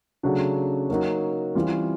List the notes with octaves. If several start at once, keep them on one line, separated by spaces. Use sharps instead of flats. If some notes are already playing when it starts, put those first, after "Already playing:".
C#3 F#3 A3 D4 F#4
F#3 A#3 D#4 F#4
E3 G3 C4 F4